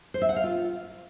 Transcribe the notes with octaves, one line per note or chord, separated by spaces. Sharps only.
C5
E5
F#5
F5
F4